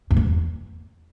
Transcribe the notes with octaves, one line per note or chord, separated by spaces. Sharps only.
F2
E2